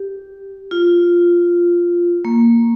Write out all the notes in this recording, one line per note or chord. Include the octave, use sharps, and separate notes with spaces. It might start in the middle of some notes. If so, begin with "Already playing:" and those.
Already playing: G4
F4
A#3